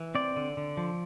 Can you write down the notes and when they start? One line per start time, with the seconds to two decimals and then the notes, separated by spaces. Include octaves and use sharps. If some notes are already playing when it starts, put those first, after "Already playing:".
Already playing: E3
0.15 C4 D5
0.36 D3
0.57 D3
0.77 F3